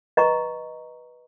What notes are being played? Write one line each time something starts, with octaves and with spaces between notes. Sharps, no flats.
B4 D#5 A#5 C#6